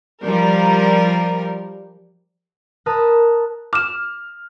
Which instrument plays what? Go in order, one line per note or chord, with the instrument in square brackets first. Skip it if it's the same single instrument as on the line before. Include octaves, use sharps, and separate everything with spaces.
[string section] F3 G3 A#4
[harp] A#4 B4 A5 D#6 F#6
[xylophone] D6 E7 [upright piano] F6